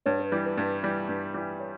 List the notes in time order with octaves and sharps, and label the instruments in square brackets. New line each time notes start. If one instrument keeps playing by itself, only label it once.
[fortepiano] G2 [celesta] C#5
[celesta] B4
[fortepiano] E3 G3
[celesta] B4
[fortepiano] G2
E3 G3
G2
E3 G3
[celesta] C#5